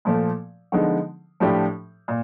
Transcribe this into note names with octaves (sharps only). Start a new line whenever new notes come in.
A#2 F3 A3
D3 F3 G#3 B3 D#4
A2 F3 A3 D4 G4
A#2